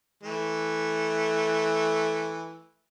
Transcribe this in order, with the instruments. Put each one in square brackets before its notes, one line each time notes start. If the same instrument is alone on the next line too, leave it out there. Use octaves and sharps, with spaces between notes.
[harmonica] E3 A3